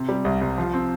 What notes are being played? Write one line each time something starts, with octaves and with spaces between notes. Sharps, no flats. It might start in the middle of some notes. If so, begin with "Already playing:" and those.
Already playing: C3
G3
C2
C2
F3
C4